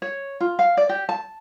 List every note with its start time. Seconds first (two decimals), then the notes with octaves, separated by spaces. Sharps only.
0.02 C#5
0.40 F4
0.59 F5
0.77 D5
0.89 G4
1.09 A5